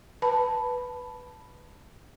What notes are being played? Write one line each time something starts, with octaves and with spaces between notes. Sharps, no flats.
B4 A5 B5